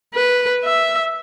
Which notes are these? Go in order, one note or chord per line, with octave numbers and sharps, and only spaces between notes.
B4
E5